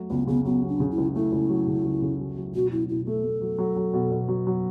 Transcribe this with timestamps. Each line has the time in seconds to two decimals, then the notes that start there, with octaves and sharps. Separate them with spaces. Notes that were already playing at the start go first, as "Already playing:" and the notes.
Already playing: F#3 A3
0.10 C#2 B3
0.27 C#3 B3
0.45 F#3 B3
0.63 F#3
0.68 D4
0.80 C#3
0.91 E4
0.98 C#2
1.15 A3 E4
1.32 C#2
1.49 F#3
1.67 C#3
1.84 C#2
2.02 C#3
2.19 F#3
2.37 F#3
2.54 B2 F#4
2.71 F#3 E4
2.89 B2 E4
3.06 A3 A4
3.24 A3
3.41 F#3
3.58 F#3
3.76 F#3
3.93 B2
4.11 B2
4.28 F#3
4.47 F#3